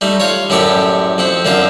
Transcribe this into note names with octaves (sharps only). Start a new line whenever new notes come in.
G3 A3 D#4
F4 C#5
F#2 A2 A3 G4 D5 C#6
F2 C4 F#5
F#2 D3 C4 F4 C5